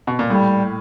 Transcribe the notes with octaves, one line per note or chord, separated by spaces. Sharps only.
B2
A#2
A2 G3